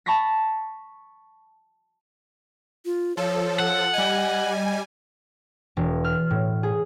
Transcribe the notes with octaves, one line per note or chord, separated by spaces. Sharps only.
A5 B5 C#6 A#6 B6
F4
F3 A4 C#5
F#5
G3 D#5 G#5
E1
F6
A2
G#4